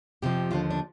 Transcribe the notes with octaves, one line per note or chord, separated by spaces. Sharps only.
F2 C3 F3 G4
D#2 D3 F3 F4
D4